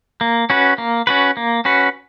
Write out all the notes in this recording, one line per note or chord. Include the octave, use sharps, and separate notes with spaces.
A#3
C#4 F#4 B4
A#3
C#4 F#4 B4
A#3
C#4 F#4 B4